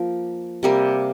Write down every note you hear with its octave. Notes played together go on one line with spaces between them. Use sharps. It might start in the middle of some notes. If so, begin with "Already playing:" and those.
Already playing: F3 A#3
C3 G3 A#3